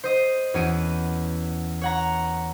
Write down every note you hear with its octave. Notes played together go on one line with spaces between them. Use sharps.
C5 D#5
E2 B3 C#4 F#4 D7 D#7
C#5 F#5 A#5